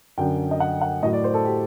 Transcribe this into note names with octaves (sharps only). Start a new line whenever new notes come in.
F#2 D3 F#3 G5
D#5
F#5
F#5
A2 F#3 D#5
D5
C5
A4
G4